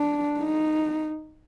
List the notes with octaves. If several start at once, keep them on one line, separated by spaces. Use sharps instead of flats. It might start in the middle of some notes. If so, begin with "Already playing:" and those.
Already playing: D4
D#4